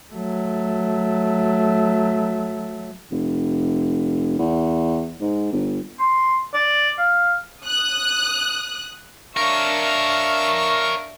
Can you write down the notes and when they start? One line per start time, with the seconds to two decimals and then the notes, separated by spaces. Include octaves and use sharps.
0.13 F#3 A3
3.12 F1
4.38 E2
5.21 G#2
5.52 G1
5.99 C6
6.54 D5
6.98 F5
7.64 D#6 F#6
9.37 D4 A#4 C#5 E5 F5 C#6